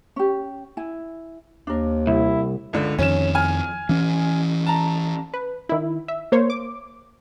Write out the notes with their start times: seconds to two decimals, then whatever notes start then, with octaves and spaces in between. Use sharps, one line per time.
0.16 C#4 G4
0.77 E4 G#5
1.67 D#2 D4 A#4
2.07 C2 E4
2.73 C#2 D3
2.98 F2 D#3 C#4 E7
3.35 G#5 F6
3.89 E3 C#4
4.66 A5 A#5
5.34 B4
5.69 D#3 E4
6.08 E5
6.32 A#3 C5 C#5
6.50 D6